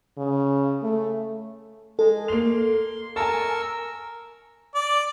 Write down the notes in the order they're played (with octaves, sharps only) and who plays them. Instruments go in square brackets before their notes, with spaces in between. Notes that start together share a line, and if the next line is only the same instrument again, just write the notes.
[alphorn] C#3
A3
[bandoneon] G#3 [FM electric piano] A4
[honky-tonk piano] A#3 F7 [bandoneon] C6
[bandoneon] A#4 C#6 E6 [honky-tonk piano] G#5 A5
[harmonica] D5